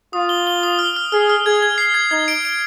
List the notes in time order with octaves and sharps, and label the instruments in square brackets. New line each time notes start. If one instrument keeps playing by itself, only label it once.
[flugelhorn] F4 [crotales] D#6
[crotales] G7
G7
D#6
F6
F6
[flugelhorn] G#4 [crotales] F6
[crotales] F6
[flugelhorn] G#4 [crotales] G#6
[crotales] G#6
C7
G#6
[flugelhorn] D#4 [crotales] G#6
[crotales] D7
D7